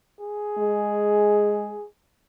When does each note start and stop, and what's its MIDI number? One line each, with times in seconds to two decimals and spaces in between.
0.20 1.86 68
0.58 1.75 56